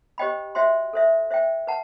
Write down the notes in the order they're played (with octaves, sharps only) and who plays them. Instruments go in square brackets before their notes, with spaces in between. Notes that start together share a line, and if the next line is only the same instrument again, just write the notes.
[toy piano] G4 C5 D#5 G5 B5
F#4 C5 E5 G5 C6
A4 C5 E5
C5 E5 G5
B4 F#5 A5